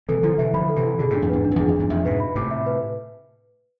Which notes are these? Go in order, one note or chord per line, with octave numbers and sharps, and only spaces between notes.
C3 E3 A4
D3 F3 E4
C3 E3 E5
D3 F3 B5
A4
C3 E3
E4
B2 D3 G#4
A2 C3 D4
F2 A2
E2 G#2 B4
D4
F2
E2 G#4
F2
E2 G#2 D4
F2 A2 E5
G#2 B2 B4
B5
A2 C3 D6
E5
B4